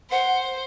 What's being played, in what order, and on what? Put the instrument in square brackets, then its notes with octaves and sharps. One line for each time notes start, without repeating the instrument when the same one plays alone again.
[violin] C5 [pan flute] F#5